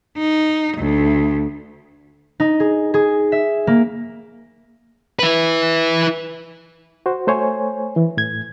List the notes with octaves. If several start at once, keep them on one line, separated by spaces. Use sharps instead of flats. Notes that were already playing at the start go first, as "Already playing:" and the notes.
D#4
D2
D#4
G#4
G#4
E5
A#3
E4 B4
F#4 C5
A3 C5 C#5 G#5
E3
A2 G#6